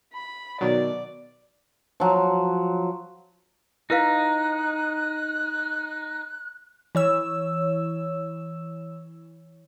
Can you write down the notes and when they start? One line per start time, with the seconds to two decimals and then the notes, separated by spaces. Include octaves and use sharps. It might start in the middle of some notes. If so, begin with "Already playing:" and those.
0.14 B5
0.61 B2 D#3 F#3 D5
2.00 F3 F#3
3.90 D#4 E4 B4 F5 F#6
6.95 E3 C#5 E6